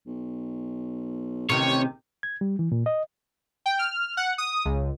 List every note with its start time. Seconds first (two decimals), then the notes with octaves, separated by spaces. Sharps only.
0.07 B1
1.49 A1 C3 D#3 C#5
2.23 G#6
2.41 G3
2.59 E3
2.72 A#2
2.86 D#5
3.66 G5
3.79 F6
4.17 F#5
4.38 D#6
4.65 C#2